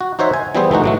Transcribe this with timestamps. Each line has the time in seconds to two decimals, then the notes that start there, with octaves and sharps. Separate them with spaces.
0.01 F#4
0.19 D#4 F#4 C5 C#5 E5
0.34 G#5
0.55 E3 G3 B3 E4 G#4 C5
0.71 E3 A3 D#4 F#4
0.84 A2 F#3 A3